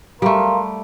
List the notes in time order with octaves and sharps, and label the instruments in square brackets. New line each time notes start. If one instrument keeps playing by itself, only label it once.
[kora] G3 A3 [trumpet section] A#4 F5 C6